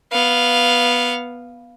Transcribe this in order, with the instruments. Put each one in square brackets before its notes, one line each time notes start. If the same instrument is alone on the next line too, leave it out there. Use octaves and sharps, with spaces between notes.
[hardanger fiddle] B3 F5